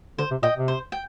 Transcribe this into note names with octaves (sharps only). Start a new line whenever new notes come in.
D3 C5
C3
A#2 D#5 G5
C3
C5
G5